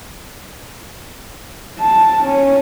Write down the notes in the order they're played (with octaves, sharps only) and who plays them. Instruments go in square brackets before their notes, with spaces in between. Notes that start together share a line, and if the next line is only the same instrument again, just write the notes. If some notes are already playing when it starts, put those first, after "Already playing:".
[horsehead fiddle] A5
C#4